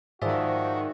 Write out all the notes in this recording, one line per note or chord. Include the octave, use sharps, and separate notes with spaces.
G#2 D#3 F3 F#4 G#4 D5 E5